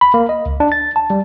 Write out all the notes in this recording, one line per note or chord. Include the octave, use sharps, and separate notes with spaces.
B5
A#3
D#5
C#2
D4
A6
A5
G3